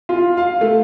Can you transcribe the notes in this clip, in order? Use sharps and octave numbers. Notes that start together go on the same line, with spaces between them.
F4
F5
A3